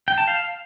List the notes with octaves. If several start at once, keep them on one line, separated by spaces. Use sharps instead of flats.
G5
A5
F5